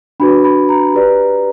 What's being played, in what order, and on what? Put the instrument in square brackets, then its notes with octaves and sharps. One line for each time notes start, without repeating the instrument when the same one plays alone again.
[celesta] D4 F#4 B4 B5
B5
A#5
G4 B4 D5